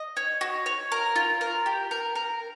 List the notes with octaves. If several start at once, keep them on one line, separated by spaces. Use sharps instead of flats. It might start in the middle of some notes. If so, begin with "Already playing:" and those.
Already playing: D#5
C#5
F#4
C#5
A#4
F4
A#4
G4
A#4
A#4